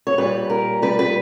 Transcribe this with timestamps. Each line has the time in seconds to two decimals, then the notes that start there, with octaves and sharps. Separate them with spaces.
0.07 C#5
0.18 A#2 G3 B4
0.50 A#4
0.82 A#2 G3 B4
0.99 B4